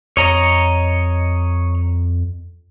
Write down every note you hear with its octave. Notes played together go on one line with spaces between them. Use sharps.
F2 C#5 D#5 A#5